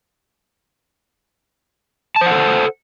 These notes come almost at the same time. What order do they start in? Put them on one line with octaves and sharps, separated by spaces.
A5 C5 F#5 A4